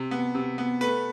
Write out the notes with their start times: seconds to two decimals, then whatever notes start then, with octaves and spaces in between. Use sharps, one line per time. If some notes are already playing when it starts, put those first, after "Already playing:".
Already playing: C3
0.11 B3
0.35 C3
0.58 B3
0.81 A3 B4